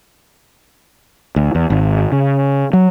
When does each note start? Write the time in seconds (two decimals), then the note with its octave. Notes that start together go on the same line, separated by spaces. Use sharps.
1.36 D2
1.55 E2
1.70 G#1
2.12 C#3
2.73 F#3